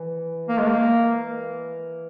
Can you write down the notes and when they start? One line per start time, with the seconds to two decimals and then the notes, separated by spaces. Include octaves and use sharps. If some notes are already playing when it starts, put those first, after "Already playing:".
Already playing: E3
0.49 A#3
0.58 G#3
0.69 A#3